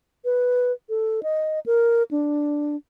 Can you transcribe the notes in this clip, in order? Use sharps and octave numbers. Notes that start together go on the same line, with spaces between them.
B4
A4
D#5
A#4
D4